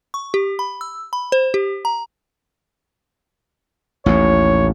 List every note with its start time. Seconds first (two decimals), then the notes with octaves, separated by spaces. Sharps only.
0.14 C#6
0.34 G4
0.59 B5
0.81 E6
1.13 B5
1.32 C5
1.54 G4
1.85 A#5
4.06 A1 D#2 A2 C#5